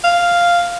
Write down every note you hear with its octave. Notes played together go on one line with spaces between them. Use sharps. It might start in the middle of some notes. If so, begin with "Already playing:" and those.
F5